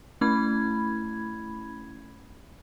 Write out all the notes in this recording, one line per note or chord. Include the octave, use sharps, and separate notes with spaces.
A3 C#4 E4 B5 G#6